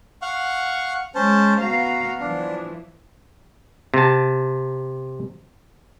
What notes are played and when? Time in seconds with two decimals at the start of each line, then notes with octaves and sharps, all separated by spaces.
0.22 F5 F#5 C#6
1.15 G#3 C#4 C5 A5
1.61 B3 F#4 F5 A#5
2.21 E3 F3 D4
3.94 C3 A5